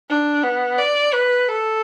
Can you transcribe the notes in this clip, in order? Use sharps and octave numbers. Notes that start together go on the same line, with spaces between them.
D4
B3
D5
B4
A4